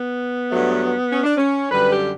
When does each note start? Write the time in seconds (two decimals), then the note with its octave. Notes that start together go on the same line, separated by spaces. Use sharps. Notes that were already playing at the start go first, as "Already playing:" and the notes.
Already playing: B3
0.51 G2 F#3 A3
1.11 C#4
1.24 D4
1.36 C#4
1.70 F#2 D3 G3 B4
1.90 G4